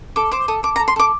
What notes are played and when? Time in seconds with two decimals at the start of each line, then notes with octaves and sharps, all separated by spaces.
0.16 A4 D6
0.32 C5 D6
0.48 A4 D#6
0.63 A4 D6
0.76 A#5
0.79 A4
0.88 C6
0.96 A4 D6